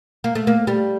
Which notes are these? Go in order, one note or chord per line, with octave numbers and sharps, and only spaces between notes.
A#3
A3
A#3
G3